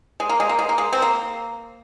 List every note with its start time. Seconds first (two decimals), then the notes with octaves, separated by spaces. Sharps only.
0.20 G#3
0.29 A#3
0.40 G#3
0.49 A#3
0.59 G#3
0.69 A#3
0.78 G#3
0.93 C4
1.02 A#3